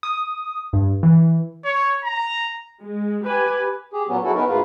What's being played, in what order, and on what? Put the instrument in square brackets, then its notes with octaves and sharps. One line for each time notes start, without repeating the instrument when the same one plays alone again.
[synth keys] D#6
G2
E3
[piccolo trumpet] C#5
A#5
[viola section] G#3
G4 B4 G#5
[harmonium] G4 G#4
A#2 F#3 B3 C#4
C#3 F#3 C#4 E4 F#4 A4
B3 C#4 D#4 A#4 B4
D2 G#2 C#3 A#3 F4 B4